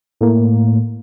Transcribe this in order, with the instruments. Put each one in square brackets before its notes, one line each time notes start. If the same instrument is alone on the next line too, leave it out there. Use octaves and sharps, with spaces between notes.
[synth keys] A2 A#3